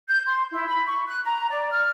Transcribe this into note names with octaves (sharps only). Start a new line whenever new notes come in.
G6
C6
E4
B5
C#6
F#6
A#5
D5
F6